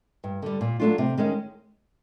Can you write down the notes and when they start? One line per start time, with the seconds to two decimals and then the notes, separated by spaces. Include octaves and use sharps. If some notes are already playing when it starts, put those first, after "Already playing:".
0.24 G2
0.42 D3 G3
0.61 A#2
0.80 F#3 A3 D4 F4
0.98 C3
1.17 D#3 G#3 C#4